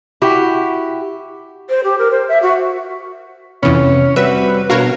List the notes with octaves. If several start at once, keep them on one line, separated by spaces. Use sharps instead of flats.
E4 F#4 G4
C5
G4
A#4
C5
E5
F#4
F2 C3 E3 B3 C#4
G3 C4 F#4 B4 E5
B2 D4 F#4 A#4 C#5 F5